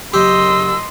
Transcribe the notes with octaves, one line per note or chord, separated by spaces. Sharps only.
F#1 F#2 G4 D#5 C6 E6